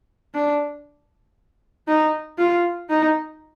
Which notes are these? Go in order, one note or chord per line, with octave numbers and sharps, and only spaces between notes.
D4
D#4
F4
D#4